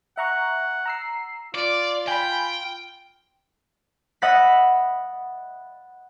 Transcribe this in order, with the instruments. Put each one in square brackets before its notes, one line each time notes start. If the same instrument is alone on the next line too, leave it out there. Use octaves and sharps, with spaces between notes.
[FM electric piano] E5 A#5 C#6 [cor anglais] F#5
[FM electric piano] A#5 E6 C7
[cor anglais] F4 [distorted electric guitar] D5 [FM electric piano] D6
[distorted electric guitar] G5 [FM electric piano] G#5 B5
[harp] D#5 E5 F#5 B5 A6 B6